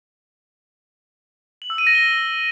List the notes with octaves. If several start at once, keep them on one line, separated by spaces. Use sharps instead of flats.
F#7
E6
D#7
A#6
G7